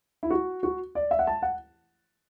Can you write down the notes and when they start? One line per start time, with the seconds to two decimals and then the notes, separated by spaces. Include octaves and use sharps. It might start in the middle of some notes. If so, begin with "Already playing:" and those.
0.23 E4
0.30 F#4
0.63 F#4
0.95 D5
1.11 E5
1.19 F#5
1.27 A5
1.42 F#5